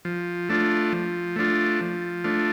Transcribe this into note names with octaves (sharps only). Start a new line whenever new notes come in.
F3
A3 D4 F4
F3
A3 D4 F4
F3
A3 D4 F4